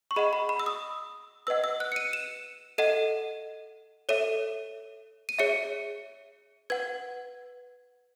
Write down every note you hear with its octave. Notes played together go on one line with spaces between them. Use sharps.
C#6
G#4 D#5 F#5 B5
B5
B5
E6
D#6
B4 D#5 F#5 E6
E6
F#6
C#7
D#7
E7
A4 D#5 F#5 D#7
A4 C#5 E5 D#7
D#7
G#4 C#5 E5 C#7
B4 F#5 G#6